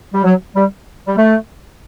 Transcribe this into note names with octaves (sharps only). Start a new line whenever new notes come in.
G3
F#3
G3
G3
A3